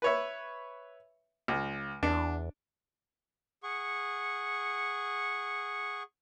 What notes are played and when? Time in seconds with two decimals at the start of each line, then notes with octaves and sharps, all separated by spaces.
0.02 B4 C#5 E5
1.48 C#2
2.03 E2 D4
3.63 G#4 F#5 C#6